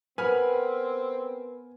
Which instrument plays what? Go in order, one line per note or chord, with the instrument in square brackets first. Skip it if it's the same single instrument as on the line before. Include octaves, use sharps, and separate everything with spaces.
[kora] B3 [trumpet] C4 [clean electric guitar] A#4 B4 [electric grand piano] G#5 F6